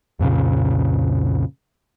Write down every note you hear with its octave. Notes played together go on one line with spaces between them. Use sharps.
C2 F2 A#2 C#3